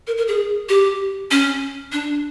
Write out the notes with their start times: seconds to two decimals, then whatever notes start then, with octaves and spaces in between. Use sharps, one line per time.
0.07 A#4
0.18 A#4
0.28 G#4
0.69 G4
1.31 C#4
1.92 D4